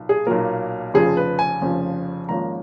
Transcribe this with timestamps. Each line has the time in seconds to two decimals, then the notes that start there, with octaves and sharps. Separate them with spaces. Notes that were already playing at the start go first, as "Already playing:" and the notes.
Already playing: B1 A#2
0.09 G#4
0.27 B1 A#2 F#3 A#3 A#4
0.94 F1 F2 C#3 F3 G#4
1.17 B4
1.39 G#5
1.61 F1 F2 C#3 F3
2.29 G#1 G#2 F3 A#3 C#4 A#5